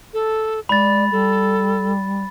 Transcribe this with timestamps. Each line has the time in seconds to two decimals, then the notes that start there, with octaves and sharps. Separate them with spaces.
0.13 A4
0.69 G#3 D5 B5 A6
1.12 G3 A4